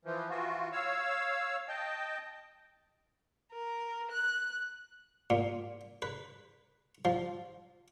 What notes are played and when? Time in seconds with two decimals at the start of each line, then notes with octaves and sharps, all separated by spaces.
0.05 E3 F3
0.30 E3 F4 F#4
0.72 C#5 F5 E6
1.68 D#5 G5 A5
3.52 A#4
4.11 F#6
5.30 A#2
6.02 B4
7.05 F3